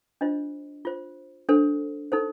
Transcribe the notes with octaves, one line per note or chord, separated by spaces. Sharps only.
D4 F4 C5 D#5
F4 C5
D4 A4 C5
D#4 A4 C5